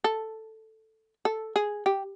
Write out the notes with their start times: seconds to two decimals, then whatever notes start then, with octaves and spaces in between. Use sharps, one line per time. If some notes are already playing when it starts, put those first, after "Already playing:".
0.04 A4
1.25 A4
1.56 G#4
1.86 G4